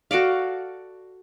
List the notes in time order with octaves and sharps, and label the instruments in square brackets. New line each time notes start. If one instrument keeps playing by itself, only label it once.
[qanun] F#4 A4 D5 F5